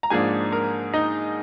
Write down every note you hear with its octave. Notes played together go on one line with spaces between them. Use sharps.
A#5
G#2 F3 A#3 D4 G#4 G#5
A#4
D#4 D#5